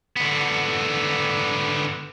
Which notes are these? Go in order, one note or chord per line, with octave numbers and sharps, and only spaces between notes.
D3 B3